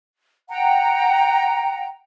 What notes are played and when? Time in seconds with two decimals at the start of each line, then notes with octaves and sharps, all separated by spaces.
0.49 F#5 G5 A#5